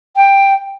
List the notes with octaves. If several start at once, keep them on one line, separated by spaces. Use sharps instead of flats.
G5